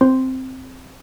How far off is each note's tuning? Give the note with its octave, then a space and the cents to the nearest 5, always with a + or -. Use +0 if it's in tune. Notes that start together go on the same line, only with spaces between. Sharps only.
C4 -5 C5 +0 C6 -5